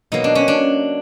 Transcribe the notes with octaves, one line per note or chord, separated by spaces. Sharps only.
B2 F#3 A#3 D#4
D4
C#4
D4